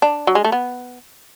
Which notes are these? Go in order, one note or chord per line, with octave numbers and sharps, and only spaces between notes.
D4
F#3
G#3
A3
B3